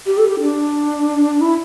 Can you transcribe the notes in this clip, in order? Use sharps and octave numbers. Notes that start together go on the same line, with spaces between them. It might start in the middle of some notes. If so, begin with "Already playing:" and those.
G4
A4
G4
D4
E4